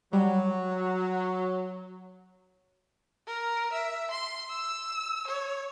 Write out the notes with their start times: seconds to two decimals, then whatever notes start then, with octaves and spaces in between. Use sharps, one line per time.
0.13 F#3 G3
3.27 A#4
3.72 E5
4.11 C6
4.50 E6
5.27 C#5